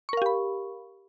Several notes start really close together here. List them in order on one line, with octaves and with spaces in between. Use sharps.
C#6 A#4 F5 G4 B5